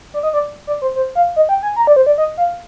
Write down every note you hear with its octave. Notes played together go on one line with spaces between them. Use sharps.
D5
D#5
D5
D5
C5
C5
F5
D#5
G5
G#5
A#5
D5
C5
D5
D#5
F5